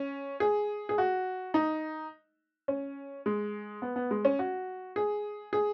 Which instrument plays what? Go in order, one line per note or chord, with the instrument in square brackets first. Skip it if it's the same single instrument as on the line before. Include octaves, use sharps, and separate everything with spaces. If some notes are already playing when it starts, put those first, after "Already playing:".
Already playing: [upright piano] C#4
G#4
G#4
F#4
D#4
C#4
G#3
B3
B3
G#3
C#4
F#4
G#4
G#4